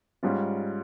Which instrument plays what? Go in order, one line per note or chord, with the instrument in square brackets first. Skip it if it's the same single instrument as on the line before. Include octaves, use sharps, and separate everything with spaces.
[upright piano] G#2 G3 C#4 F4